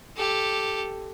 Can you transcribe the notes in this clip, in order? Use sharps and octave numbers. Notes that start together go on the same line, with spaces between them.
G4 A4